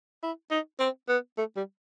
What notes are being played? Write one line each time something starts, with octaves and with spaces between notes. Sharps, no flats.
E4
D#4
C4
B3
A3
G3